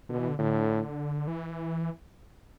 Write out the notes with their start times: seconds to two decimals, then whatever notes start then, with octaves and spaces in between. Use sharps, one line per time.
0.09 B2 D3
0.19 E3
0.28 D3
0.39 A2 D3
1.27 E3